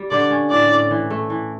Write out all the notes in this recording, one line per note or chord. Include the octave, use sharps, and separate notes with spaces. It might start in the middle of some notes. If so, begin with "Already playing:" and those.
Already playing: G3
D3 D5
C#4
A2 D5
A2
E3
A3
E3